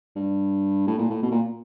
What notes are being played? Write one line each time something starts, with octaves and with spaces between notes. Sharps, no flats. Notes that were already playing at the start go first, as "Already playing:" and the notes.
G2
A2
A#2
A2
B2
A#2